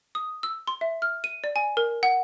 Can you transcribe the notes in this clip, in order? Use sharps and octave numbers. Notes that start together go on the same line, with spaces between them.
D#6
E6
C6
E5
F6
D#7
D5
G#5
A#4
F#5